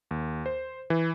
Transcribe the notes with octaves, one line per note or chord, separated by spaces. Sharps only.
D#2
C5
E3